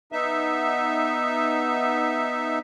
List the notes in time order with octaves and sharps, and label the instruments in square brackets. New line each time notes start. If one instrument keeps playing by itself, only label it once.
[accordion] B3 D#4 E5